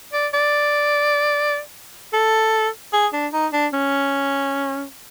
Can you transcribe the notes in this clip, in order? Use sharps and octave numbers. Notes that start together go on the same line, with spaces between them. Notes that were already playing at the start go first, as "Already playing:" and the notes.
D5
D5
A4
G#4
D4
D#4
D4
C#4